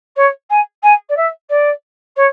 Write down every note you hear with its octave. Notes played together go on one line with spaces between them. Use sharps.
C#5
G#5
G#5
D5
E5
D5
C#5